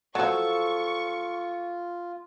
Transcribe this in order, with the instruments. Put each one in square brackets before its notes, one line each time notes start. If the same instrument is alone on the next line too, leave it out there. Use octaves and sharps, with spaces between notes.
[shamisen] F3 F#3 [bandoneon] F4 [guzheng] A4 A5 [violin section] C#6